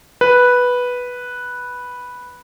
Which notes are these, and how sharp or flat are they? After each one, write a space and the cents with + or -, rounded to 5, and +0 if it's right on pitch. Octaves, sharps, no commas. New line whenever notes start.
B4 -5